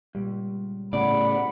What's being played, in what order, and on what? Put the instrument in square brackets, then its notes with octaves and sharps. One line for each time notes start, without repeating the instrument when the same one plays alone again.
[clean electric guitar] C#2 [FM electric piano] A#2 G3
[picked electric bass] A2 C#3 [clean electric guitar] D5 [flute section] F#5 B5